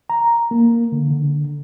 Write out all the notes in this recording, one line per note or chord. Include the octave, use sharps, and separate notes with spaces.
A#5
A#3
D3
D3